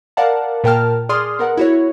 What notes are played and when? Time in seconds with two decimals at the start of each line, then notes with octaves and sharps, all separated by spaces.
0.17 A#4 D5 F5 F#5 A5
0.64 A#2 A#4 G5 A5 F6
1.09 G#4 D5 C6 D#6 F6
1.39 B3 A#4 F#5
1.57 E4 F#4 C#5